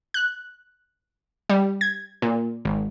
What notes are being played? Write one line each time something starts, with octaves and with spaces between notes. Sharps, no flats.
F#6
G3
G#6
A#2
G#1